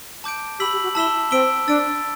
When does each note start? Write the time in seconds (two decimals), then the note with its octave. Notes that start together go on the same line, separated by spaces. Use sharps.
0.24 A5 D6 G6 D7
0.59 G4 B5 E6 B6 F#7
0.72 G4
0.83 F#4
0.95 E4 A5 E6 B6 E7 G7
1.31 C4 E6 B6 D7 G7
1.67 D4 E6 A6 D7